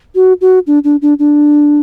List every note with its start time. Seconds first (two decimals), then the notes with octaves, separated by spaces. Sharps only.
0.15 F#4
0.41 F#4
0.67 D4
0.84 D4
1.02 D4
1.19 D4